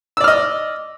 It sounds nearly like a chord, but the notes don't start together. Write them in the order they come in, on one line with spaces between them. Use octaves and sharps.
E6 D5 F6 D#5